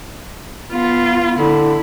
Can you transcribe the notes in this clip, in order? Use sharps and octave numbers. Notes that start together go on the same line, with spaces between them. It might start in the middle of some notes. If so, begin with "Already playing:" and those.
B3 F4
D3 E4